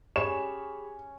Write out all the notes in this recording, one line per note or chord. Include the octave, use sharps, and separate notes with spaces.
C#4 G4 G#4 C#5 B5 E7